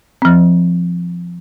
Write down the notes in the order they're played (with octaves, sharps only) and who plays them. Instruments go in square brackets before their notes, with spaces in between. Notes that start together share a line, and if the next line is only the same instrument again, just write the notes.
[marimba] F3 C4